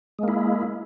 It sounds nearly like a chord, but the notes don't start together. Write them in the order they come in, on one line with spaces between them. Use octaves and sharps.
G#3 A#3 E4